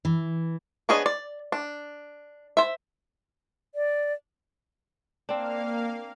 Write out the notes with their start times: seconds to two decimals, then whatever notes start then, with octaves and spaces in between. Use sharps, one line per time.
0.05 E3
0.89 B3 D4 G#4 C#5 D#5
1.06 D5
1.52 D4
2.57 C5 E5
3.75 D5
5.29 A#3 C4 D4 F5